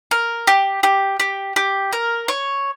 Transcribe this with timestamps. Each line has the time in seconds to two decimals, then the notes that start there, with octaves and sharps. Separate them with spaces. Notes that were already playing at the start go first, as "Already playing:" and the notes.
0.11 A#4
0.47 G4
0.83 G4
1.20 G4
1.56 G4
1.93 A#4
2.28 C#5